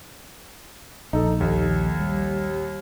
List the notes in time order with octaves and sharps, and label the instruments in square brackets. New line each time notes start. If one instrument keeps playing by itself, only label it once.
[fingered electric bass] A#1 [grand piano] D#4 A4
[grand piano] D#2
[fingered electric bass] G3